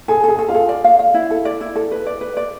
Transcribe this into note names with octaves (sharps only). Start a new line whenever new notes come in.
G#4 A4 G#5
G#4 A4 G#5
A4
F4 F5
A4
D5
F5
F5
E4
A4
D5
E4
A4
B4
D5
B4
D5